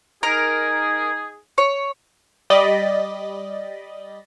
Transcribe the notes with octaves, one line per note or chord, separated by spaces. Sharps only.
D#4 G#4 A#4
C#5
G3 D5 D#5 A6 B6